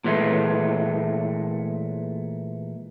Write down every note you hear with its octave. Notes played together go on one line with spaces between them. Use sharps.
A#2 E3 G#3 A3